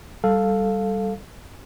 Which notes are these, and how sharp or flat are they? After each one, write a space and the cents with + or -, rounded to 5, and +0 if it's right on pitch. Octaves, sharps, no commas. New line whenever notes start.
G3 +0 A4 +0 F5 +0